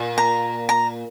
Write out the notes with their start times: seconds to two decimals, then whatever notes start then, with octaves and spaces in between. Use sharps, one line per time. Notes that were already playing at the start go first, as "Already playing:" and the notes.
Already playing: A#2
0.18 A#5
0.69 A#5